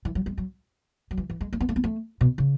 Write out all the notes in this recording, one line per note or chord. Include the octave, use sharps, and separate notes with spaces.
E3
F#3
G#3
F#3
F#3
E3
E3
G#3
A3
B3
A3
B3
A3
B2
C#3